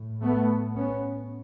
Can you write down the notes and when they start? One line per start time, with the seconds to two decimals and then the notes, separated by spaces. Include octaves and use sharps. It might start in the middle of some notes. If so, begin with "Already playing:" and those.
Already playing: A2
0.21 A3 B3
0.75 B3 C#4